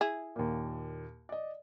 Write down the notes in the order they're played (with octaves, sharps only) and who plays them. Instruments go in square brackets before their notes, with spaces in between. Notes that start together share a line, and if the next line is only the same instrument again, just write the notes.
[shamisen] E4 G#4
[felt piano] D#2 A#2
D5 D#5